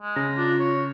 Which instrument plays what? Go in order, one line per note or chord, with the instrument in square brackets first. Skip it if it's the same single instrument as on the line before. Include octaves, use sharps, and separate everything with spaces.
[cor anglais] G#3
[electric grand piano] C#3 [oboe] A#5
[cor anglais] D4 [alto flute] F4
[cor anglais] C#5